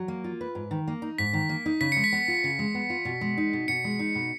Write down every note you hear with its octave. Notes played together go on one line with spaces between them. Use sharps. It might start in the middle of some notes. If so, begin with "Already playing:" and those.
Already playing: F#3
A#3
F4
B4
G#2
D#3
A#3
D#4
G#2 B6
D#3
A#3
D#4
C#3 B6
G#3 C#7
B6
B3
F4
C#3
G#3
B3
F4
B2
G#3
D#4
B2
B2 C#7
G#3
D#4
B2